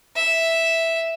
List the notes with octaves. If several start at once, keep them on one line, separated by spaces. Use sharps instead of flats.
E5